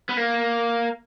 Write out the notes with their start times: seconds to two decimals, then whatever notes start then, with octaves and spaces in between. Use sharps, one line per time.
0.09 B3
0.17 A#3